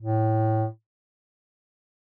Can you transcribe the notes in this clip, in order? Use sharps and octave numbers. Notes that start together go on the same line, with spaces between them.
A2